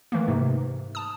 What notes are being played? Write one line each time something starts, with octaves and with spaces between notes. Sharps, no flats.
D#3 E3 A3 A#3
G#2 C3
A5 D#6